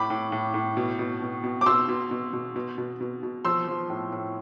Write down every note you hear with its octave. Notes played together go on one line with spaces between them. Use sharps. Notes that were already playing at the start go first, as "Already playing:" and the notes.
Already playing: A2 B5 D6
A2
A2
A2
B2
B2
B2
B2
D6
B2 C6 E6
B2
B2
B2
B2
B2
B2
B2
F3 C6 E6
F3
A2
A2